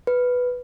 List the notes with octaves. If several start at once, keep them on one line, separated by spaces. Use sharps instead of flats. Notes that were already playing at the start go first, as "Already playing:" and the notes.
B4